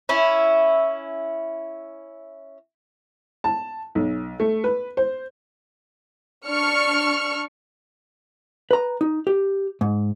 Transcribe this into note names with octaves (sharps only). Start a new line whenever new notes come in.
C#4 E4
A5
B1
A3
B4
C5
D4 C#6 F6 C#7
B4 A#5
D#4
G4
G#2